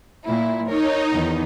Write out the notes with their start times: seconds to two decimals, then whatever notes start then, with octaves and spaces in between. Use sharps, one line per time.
0.25 A#2 E4
0.69 D#4 A#4 C#5
1.12 E2 D#3